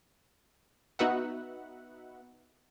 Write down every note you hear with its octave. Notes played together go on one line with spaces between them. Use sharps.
B3 D#4 F#4 B4 E5 F#5